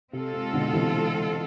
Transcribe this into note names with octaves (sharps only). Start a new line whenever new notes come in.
C3 G#3 C4 F4 A4
C3
B2 D3
C3 E3